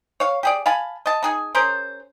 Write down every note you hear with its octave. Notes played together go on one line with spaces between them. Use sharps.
C#5 F5
G4 G#4 D5
F5 G#5 A5 B5
D#5 A5
D#4 G#4 G#5
C#4 G#4 A#4 C5